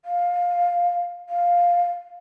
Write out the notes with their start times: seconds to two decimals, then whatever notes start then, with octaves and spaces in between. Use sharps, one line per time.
0.05 F5
1.29 F5